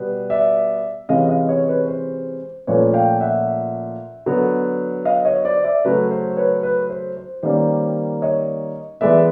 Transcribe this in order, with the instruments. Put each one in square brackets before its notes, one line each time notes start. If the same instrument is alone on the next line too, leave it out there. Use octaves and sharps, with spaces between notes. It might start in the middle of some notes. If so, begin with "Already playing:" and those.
Already playing: [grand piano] B2 G3 B3
D5 E5
C3 E3 G#3 C#4 D#5 F5
D#5 F5
C#5 D#5
B4 C#5
C5
A#2 F3 A3 C#4 B4 C#5
F5 G5
E5 F#5
D3 F#3 B3
D#5 F5
C#5 D#5
C5 D5
D5 E5
C#3 F#3 A3 C#4 B4
C5
B4 C#5
B4
C5
C5
D#3 G3 A#3 C#4 C5 D5
C#5 D#5
E3 G#3 B3 D5 E5